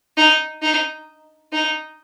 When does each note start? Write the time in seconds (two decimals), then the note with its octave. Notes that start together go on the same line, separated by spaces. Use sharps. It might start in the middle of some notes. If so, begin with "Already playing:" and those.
0.17 D#4
0.62 D#4
1.52 D#4